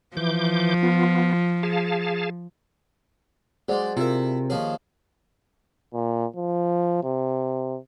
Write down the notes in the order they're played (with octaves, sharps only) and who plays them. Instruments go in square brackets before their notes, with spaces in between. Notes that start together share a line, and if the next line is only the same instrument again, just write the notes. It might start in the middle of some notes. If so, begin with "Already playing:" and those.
[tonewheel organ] E3 D6 G6 [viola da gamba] F3
[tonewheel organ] B3 F4
G#4 F5 A5
[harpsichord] F#3 G#3 [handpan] G#4 C5 D5
[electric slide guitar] C3 [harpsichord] E4 E5 [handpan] F4 A#4
[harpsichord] D#2 F3 G#4 [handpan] C#5
[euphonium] A#2
F3
C3